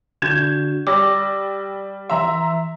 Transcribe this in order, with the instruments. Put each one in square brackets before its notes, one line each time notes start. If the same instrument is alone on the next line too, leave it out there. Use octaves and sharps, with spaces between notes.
[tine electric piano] D3 D4 F#4 [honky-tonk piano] G6 G#6 E7
[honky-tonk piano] G3 [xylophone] D6 [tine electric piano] E6 A#6
[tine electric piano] E3 C6 [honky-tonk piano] E5 A#5